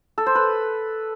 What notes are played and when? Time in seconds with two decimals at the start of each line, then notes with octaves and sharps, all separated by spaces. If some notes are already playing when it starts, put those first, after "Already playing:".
0.18 A4
0.26 C5
0.35 B4